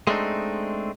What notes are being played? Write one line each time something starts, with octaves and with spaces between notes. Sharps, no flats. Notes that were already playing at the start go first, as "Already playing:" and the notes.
G#3 A3 C4 D4 D#4